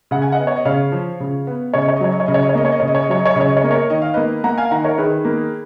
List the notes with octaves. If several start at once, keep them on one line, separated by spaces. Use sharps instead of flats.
C#3 F#5
G#5
D#5 F#5
B3
C#5
D#5
C#3 C#5 F5
F3
C#3
B3
C#3 C#5
D#5
C#5
D#5
F#3 C#5
D#5
C#5
C#3 D#5
C#5
D#5
C#5
A#3 D#5
C#5
D#5
C#3 C#5
D#5
C#5
D#5
F#3 C#5
D#5
C#5
D#5
C#3
C#5
D#5
C#5
A#3 D#5
A#4 C#5
D#3 D#5
F5
A#3 B4 D#5
A#3 F#5 A#5
F5 G#5
D#3 F#5 A#5
A#4 C#5
D#3 G#4 B4
A#3